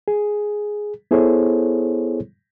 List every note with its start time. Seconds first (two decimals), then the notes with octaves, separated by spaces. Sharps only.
0.08 G#4
1.11 B3 E4 G#4 A4 C5 C#5